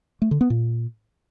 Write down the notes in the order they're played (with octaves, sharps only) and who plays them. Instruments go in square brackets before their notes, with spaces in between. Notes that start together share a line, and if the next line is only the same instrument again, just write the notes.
[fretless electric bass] A3
D3
B3
A#2